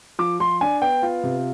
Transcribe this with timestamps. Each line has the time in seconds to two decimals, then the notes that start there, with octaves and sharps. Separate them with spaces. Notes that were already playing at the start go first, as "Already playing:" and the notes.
0.19 F3 D6
0.40 F3 C6
0.61 D4 G#5
0.82 B3 G5
1.02 F4
1.23 C3